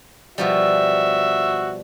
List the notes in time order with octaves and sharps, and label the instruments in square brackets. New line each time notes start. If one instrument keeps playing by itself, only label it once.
[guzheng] B2 F3 G3 [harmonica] F#4 E5